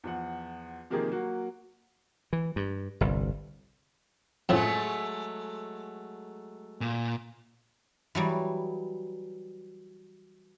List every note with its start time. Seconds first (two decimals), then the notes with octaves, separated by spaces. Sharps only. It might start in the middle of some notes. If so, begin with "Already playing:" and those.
0.04 E2 F3 F#5
0.90 C3 D#3 F3 A#3 G4 G#4
1.11 F#3 A#3 F#4
2.33 E3
2.56 G2
3.01 G1 C2
4.49 F2 A2 C#3 F#3 G#3 A3
6.81 A#2
8.15 E3 F#3 G3